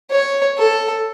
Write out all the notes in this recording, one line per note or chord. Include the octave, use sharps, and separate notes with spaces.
C#5
A4